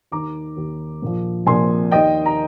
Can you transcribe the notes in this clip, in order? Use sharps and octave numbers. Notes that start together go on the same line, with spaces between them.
D#2 D#3 A#5 D6
D#2 D#3
A#1 A#2 F3
A#1 A#2 F3 G#5 C6
D#2 D#3 D#5 G5
A#5